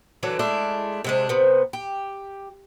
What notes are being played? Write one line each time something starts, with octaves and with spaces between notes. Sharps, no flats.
D3 E3 F#3 D4
G#3 A3 D4 E4
C3 G#3 D4
C3 B3
G4